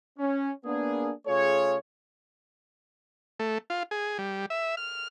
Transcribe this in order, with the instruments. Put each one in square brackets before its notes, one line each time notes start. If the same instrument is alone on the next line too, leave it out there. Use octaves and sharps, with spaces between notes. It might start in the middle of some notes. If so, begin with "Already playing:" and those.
[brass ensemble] C#4
A#3 B3 D4 G#4
C#3 A3 F4 G#4 C#5
[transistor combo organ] A3
F4
G#4
G3
E5
F6